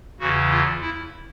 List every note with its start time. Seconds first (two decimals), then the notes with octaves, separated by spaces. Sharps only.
0.20 E2 C#3 E3 F#4
0.51 F4
0.80 E4